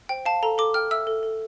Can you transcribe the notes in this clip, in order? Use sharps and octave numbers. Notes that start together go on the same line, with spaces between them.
C5 G5
F5 A5
A4 A#5
A4 D6
G5 F6
E5 E6
A4
A4